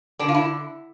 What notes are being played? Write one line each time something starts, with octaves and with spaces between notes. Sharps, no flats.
D3 D4
F4
E4